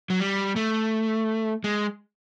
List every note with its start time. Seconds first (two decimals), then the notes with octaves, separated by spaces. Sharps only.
0.10 F#3
0.20 G3
0.56 A3
1.64 G#3